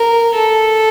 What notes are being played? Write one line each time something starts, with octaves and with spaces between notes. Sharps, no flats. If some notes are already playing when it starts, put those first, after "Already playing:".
Already playing: A#4
A4